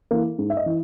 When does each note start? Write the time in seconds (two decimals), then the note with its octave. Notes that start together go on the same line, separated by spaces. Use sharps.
0.11 E3 A#3
0.39 G#2
0.50 E5
0.57 D#5
0.66 E3